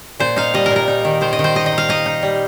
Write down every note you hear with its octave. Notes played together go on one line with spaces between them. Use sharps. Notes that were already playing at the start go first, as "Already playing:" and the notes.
A#2 C5
D#4 F5
G3 D#5
A#4
A#2
A#4
D#4
D#3
D#3 C5
D#5
D#3
C5
D#4 D#5
D#5
D#4
F5
D#4 D#5
D#4
G3